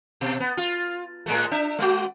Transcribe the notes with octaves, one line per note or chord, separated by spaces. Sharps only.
B2
B3
F4
A2 G#3 A3
D4 E5
G#3 F#4